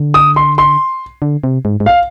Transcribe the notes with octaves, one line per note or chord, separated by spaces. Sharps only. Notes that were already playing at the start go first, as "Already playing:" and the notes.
Already playing: D3
D#6
C6
C6
D3
C3
G#2
G#2
F5